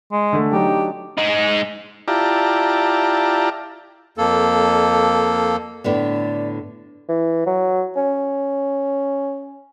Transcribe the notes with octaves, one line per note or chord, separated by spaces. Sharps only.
G#3
D3 A3
F#3 D4 D#4 G4
G#3 D#4
E4 F4 G4 D5 A5 A#5
F2 A#3 A4
A2 D3 B3 D5
E3
F#3
C#4